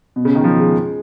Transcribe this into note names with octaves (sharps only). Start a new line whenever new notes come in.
B2
C#3
D#3
F3
G#3